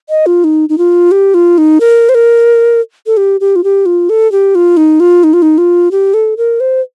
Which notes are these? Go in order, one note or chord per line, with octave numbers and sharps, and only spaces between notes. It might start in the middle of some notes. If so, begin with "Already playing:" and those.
D#5
F4
D#4
D#4
F4
G4
F4
D#4
A#4
C5
A#4
A4
G4
G4
F4
G4
F4
A4
G4
F4
D#4
F4
D#4
F4
D#4
F4
G4
A4
A#4
C5